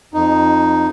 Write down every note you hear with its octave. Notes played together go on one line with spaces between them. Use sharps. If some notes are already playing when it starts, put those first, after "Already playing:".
F2 D#4